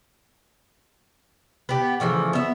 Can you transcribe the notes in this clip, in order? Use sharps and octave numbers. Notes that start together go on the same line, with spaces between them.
B3 G4
C#3 E3 F3 A3
B3 E5